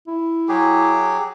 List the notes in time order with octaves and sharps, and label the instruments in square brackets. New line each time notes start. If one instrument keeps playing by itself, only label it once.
[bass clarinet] E4
[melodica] F#3 G4 G#4